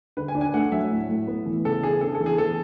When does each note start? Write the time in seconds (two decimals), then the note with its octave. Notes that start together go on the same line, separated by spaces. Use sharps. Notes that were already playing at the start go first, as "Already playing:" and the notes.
0.17 D3 B4
0.28 G#5
0.35 D4
0.41 G#5
0.54 A3 F#5
0.72 F#3 E5
0.91 A2
1.09 A2
1.27 B3
1.46 E3
1.64 C#3 A4
1.83 D4 G#4
2.01 B3 A4
2.15 A4
2.20 E3
2.26 G#4
2.38 E3 A4